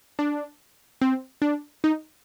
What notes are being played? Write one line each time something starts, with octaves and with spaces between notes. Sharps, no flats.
D4
C4
D4
D#4